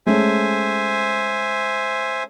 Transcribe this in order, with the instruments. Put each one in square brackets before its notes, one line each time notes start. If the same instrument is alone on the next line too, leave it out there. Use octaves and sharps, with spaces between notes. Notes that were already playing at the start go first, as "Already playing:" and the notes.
[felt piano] G#3 A3 C#4 [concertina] C5 E5 G#5